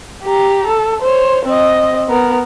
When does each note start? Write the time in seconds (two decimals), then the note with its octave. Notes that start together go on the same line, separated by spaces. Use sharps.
0.23 G4 A#5
0.67 A4
1.02 C5 C#5
1.45 C4 D#5
2.09 B3 A#4